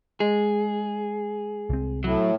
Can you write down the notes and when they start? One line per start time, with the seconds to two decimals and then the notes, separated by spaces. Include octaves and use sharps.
0.20 G#3 G#4
1.70 C2 C4
2.04 A2 F#3